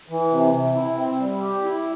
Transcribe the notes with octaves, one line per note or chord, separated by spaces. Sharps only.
E3
C3
C3
E4
C4
G3
G4
E4